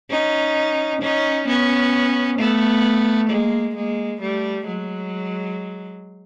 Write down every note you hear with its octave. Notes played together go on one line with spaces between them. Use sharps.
C#4 D#4
C#4 D#4
B3 C#4
A3 B3
G#3 A#3
G#3 A#3
G3 A3
F#3 G#3